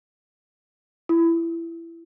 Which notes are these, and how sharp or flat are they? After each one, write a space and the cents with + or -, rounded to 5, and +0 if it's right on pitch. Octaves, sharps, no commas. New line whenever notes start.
E4 +20